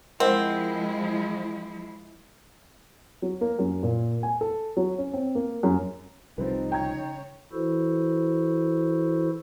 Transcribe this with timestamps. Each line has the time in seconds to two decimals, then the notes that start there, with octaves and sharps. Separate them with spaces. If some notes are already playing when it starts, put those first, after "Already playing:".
0.20 F3 G#3 C4 E4 A#4 D#5 F#5
3.22 F#3
3.41 A#3
3.59 F#2
3.83 A#2
4.23 G#5
4.41 A4
4.77 F#3
4.98 C#4
5.13 C4
5.35 A#3
5.63 F#2
6.38 C2 C3 F3 G3 C4 D#4 B4
6.72 C#3 C#5 G5 A#5 G#6
7.52 E3 E4 F#4 A4 C5